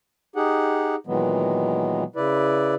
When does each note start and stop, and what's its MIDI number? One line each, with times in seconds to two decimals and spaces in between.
0.36 0.95 63
0.36 0.95 67
0.36 0.95 68
0.36 0.95 78
1.07 2.04 46
1.07 2.04 51
1.07 2.04 52
1.07 2.04 54
1.07 2.04 56
1.07 2.04 59
2.16 2.75 49
2.16 2.75 64
2.16 2.75 71
2.16 2.75 74